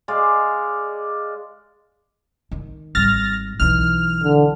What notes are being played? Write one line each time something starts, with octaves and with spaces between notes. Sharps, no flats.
G#3 D5 F5
D#3
G#1 G3 F6 A6 A#6
B1 E3 F6
D3